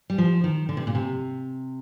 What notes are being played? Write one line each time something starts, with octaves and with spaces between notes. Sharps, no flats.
G3
F3
D#3
D3
C3
A#2
C3